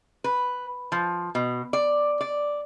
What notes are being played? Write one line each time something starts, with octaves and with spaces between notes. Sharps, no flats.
B4
F3
B2
D5
D5